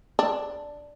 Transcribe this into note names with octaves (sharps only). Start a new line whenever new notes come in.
D4